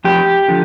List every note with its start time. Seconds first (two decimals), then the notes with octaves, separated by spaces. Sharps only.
0.04 F2 G4
0.48 D3 F3